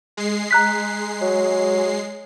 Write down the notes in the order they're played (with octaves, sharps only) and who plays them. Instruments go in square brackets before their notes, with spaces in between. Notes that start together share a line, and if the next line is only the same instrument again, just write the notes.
[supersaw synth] G#3 C7
[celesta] A#5 F#6 B6
[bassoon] F#3